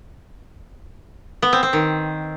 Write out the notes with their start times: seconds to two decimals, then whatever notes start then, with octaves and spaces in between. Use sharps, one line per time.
1.42 B3
1.53 C4
1.63 C4
1.73 D#3